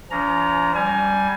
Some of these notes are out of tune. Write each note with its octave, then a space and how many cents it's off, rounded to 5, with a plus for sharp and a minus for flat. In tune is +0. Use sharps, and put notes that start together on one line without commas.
F3 -30 C#4 +45 A#5 +0
G3 +0 G#5 +20